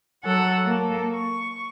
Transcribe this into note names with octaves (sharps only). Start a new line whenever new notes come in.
F#3 A4 F#5
A#3 A4
C#6